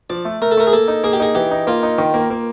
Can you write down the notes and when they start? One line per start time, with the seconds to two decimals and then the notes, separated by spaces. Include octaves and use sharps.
0.10 F3 D5
0.25 A3
0.42 A3 A#4
0.51 A4
0.57 A3 A#4
0.67 G#4
0.73 A#3 A4
0.88 D#4
1.04 A#3 G#4
1.13 G4
1.20 D#4 G#4
1.35 E3 G4
1.51 D#4
1.67 A#3 F4
1.83 D#4
1.98 D#3
2.14 A#3
2.30 A#3